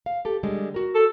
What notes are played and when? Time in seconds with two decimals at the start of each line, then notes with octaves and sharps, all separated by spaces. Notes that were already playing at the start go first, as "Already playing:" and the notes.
0.06 F5
0.25 G4 A4
0.43 D3 G3 G#3
0.74 F#4 A#4
0.95 A4